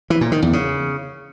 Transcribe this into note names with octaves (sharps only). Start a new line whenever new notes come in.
E3
A#2
D#3
E2
C#3